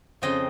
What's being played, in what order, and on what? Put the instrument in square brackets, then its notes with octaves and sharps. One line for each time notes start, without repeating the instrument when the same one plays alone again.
[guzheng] F2 C#3 F3 D#5 G5